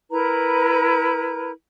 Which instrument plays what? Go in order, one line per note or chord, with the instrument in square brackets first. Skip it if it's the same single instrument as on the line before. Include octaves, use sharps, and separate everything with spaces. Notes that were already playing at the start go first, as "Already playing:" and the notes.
[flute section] E4 A#4 B4 A#5